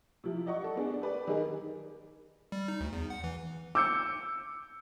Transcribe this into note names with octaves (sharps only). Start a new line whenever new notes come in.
C3 F3 E4
D5 D#5 F#5 C#6
A4
B3 D4 G#4
G4 B4 D5
D#3 D#4 G#4 A#4
G3
D#4
D2
E2
F#5
E3
D6 E6 G6 C#7